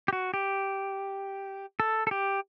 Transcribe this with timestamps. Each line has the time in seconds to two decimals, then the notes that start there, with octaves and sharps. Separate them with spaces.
0.08 G4
0.13 F#4
0.34 G4
1.80 A4
2.07 A4
2.11 G4